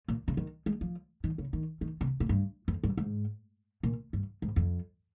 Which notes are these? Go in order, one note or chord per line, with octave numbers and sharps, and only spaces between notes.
A#2
C#3
D#3
G#3
F3
D#3
C#3
D#3
D#3
C3
A#2
G2
F2
G2
G#2
A#2
G2
G#2
F2